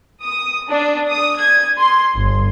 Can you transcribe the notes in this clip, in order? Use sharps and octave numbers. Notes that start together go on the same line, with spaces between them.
D#6
D4
D#6
G#6
C6
G1